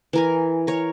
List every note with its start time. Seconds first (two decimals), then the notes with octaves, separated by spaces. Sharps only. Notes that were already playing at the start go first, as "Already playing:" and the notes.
0.13 E3 A#4 G#5
0.67 A#4 C#5